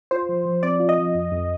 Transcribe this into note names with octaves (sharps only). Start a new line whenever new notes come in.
F4 C5
F3
F3
C4 D5
F4
D#5
F3
F2
F2